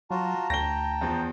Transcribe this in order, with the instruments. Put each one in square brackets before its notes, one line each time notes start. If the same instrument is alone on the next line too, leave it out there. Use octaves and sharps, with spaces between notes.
[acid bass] F#3 [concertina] F4 F#4 [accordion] A5 A#5
[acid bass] D2 [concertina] G5 [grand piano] A#6 G7
[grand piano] E2 F3